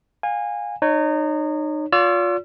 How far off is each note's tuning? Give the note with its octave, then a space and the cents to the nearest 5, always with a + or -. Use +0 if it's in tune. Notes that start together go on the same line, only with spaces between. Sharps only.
F5 +25 G#5 -25
D#4 -30 C#5 +0
F4 +25 D5 -40 E6 +40